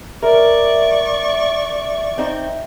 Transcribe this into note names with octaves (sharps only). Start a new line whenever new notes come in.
A#4 D5 E5 C#6
C4 D#4